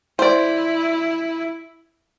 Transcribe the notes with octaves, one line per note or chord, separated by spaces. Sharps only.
E4 C5 D5